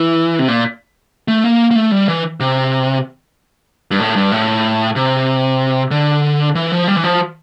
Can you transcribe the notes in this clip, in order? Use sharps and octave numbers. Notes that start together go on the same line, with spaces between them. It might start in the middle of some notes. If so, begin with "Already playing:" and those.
Already playing: E3
C3
A#2
A3
A#3
A#3
A3
G3
E3
C3
G2
A2
G2
A2
C3
D3
E3
F3
G3
E3
F3